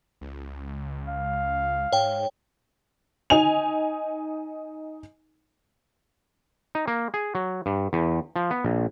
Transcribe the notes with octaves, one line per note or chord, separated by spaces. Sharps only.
C#2
F5
G#2 C#5 G5
D#4 G#5 F7
D#4
A#3
G#4
F#3
G2
E2
F3
B3
A#1